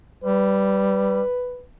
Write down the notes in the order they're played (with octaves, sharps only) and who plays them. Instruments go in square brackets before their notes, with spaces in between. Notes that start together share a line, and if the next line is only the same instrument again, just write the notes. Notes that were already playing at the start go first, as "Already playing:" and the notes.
[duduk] G3 [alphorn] B4